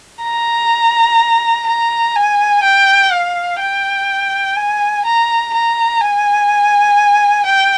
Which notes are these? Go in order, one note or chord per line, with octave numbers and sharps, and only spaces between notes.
A#5
A#5
G#5
G5
F5
G5
G#5
A#5
A#5
G#5
G5